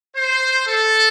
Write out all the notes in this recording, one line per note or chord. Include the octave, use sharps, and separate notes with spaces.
C5
A4